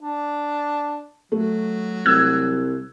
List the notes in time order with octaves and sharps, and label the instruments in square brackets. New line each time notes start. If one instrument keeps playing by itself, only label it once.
[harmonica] D4
[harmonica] F#3 [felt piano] A3
[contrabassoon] C2 [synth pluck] E6 F#6 G#6